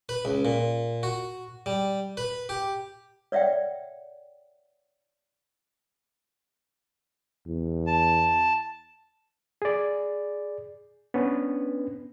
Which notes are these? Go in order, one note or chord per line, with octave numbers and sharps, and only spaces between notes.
B4
C#2
A#2
F#4
G3
B4
G4
C#5 D5 E5 F#5 G5
E2
A5
G#4 D5
B3 C#4 D4 B4